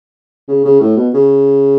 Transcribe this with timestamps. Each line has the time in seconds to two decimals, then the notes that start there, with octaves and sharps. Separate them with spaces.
0.48 C#3
0.65 C#3
0.80 A2
0.96 B2
1.14 C#3